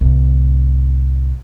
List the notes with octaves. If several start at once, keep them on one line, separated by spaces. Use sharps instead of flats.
C2 A2